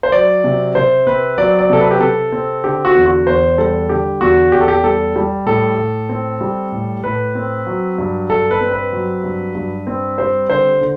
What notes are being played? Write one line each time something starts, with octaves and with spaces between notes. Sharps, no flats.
C5
F#3 D5
C3
C3 C5
C4 B4
F#3 D5
D5
C3 A4
B4
G4
C3 A4
C4
D3 G4
F#4
E2
F#4
E2 C5
G3 A4
D3 G4
E2 F#4
E2 G4
A4
G4
G3 A4
G3
A2 A4
A2
C4
G3
A2
A2 B4
C4
F#3
G2
G2 A4
B4
C4
B4
F#3
G2
G2
C4
G3 C5
D3 C5
D3